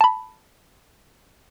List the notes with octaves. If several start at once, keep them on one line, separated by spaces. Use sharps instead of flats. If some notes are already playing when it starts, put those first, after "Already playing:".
A5 B5